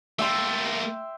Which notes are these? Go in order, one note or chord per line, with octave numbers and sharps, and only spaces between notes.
A3 A#3 E5 G5 C6